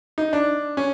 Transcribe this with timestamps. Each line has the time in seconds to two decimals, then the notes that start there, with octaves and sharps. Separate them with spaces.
0.18 D#4
0.33 D4
0.77 C#4